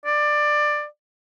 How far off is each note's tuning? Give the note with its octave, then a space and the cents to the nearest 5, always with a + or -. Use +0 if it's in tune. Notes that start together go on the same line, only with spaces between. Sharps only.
D5 +20